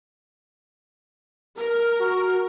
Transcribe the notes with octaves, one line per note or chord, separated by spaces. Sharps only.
A#4
F#4